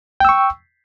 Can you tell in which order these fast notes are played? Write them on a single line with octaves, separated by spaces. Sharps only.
G5 E6 C#6